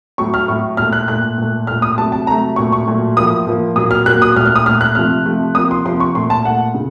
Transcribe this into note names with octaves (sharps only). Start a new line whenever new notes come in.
A2 F#3 A3 C#6
F6
A2 F#3 A3 C#6
A#2 A3 F6
F#6
A#2 A3 F#6
A#2 A3
A#2 A3 F6
D#6
C3 F#3 A3 A5
A5
C3 F#3 A3 A#5
A#2 F#3 A3 C#6
C#6
A#2 F#3 A3
A2 F3 A#3 D#6
A2 F3 A#3
A#2 F#3 A#3 D#6
F6
A#2 F#3 A#3 F#6
D#6
A#2 A3 F6
F6
D#6
A#2 A3 F6
F#6
C3 F3 A3 F6
C3 F3 A3
C3 F3 A#3 D#6
C6
C3 F3 A#3 C6
C#6
A#2 A3 C6
A5
A#2 A3 F#5
C#3